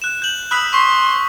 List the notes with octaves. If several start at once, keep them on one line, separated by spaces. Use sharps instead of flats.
F#6 E7
G6 F#7
B5 D#6 E6 F#6
C6 C#6 B6